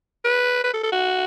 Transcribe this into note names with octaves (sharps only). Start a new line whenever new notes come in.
B4
B4
A4
A4
F#4